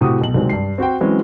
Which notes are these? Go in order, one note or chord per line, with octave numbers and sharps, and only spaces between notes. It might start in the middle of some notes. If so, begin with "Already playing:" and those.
A2 C3 F#4 D#6
B1 F#7
C2 D#3 F#3 G#3 C4
G2 C7
C4 F#4 C5 G5
E3 F#3 G#3 C4 C#4